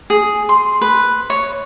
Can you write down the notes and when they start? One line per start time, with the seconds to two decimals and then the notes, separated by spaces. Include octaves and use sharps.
0.10 G#4
0.49 C6
0.81 B4
1.30 C#5